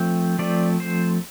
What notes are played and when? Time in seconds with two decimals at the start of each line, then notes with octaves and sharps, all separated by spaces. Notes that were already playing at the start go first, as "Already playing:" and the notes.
Already playing: F3 A3 C4
0.39 F3 A3 C4 D5
0.80 C5